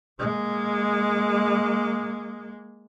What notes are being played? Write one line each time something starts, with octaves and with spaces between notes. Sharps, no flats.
G#3 A#3